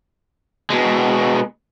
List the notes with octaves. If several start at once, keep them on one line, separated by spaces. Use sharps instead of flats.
B2 G#3